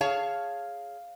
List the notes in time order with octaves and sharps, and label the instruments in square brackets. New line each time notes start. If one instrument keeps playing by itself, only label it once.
[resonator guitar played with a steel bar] G#4 C#5 A5 [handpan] F5